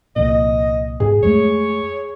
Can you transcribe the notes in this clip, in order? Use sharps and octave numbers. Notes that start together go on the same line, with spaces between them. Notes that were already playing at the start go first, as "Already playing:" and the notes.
C2 F2 A#2 D#5
G#2 G#4
F2 G#3 A3 C#5